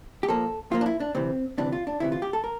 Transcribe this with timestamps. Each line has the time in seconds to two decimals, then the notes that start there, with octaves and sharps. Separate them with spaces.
0.23 G4
0.28 A#2 F3 A#3 A4
0.71 A#2 F3 A#3 F4
0.81 D4
0.86 E4
1.00 D4
1.14 D2 C3 E3 C4
1.58 D2 C3 E3 D4
1.73 F4
1.87 D4
2.00 D2 C3 E3 E4
2.12 F4
2.22 G4
2.33 A4
2.44 A#4